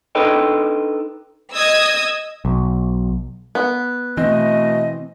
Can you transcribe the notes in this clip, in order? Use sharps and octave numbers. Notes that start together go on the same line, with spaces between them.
D4 D#4 A4 B4 D#5 G5
D#5 D#6 E6 G#6
B1
B3
B2 E3 A3 C4 D#5